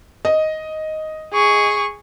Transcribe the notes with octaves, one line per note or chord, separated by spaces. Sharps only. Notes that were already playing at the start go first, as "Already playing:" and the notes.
D#5
G#4 C#6